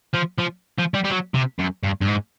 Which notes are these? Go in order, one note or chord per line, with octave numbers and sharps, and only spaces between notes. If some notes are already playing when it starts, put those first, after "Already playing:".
F3
F3
F3
G3
G3
F#3
C3
F#2
G2
G2
G#2